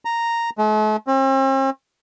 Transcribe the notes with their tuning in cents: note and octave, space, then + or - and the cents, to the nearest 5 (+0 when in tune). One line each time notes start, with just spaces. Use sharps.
A#5 -5
A3 -45
C4 +45